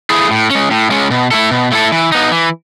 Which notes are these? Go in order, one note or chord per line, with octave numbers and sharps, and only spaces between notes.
A3 E4 G#4
A2
G#3 C#4
A2
G#3 C#4
B2
A3 E4 A4
B2
A3 E4 A4
E3
B3 D#4
E3